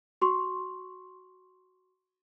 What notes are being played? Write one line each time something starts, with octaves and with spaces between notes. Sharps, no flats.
F#4 C6 C#6